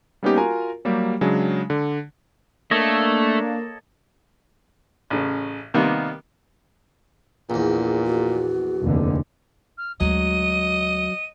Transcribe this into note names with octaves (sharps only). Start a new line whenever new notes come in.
G3 A#3 B3 C#4 D#4 G4
F4 F#4 A#4 G#5 A#5
F#3 G3 A#3 G4
C#3 F#3 G#3 D4
D3
A3 A#3 D4 A4 C#5 D#5
A1 C#3
C3 D#3 G3 A#3 B3
A#1 E2 A#2
F#4
F1 D#2 D3
F6
D2 F#3 G#3 D#5 D#7